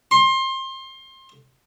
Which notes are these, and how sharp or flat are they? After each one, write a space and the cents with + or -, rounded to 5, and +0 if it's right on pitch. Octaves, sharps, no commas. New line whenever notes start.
C6 +25